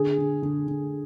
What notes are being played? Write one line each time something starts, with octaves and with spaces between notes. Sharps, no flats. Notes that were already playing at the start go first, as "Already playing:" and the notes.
Already playing: D3 G#4
D3
D3
D3